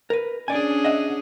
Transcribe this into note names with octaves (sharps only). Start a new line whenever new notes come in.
A#4 B4
C#4 D4 G#4 D5 G#5
D#5 E5 F#5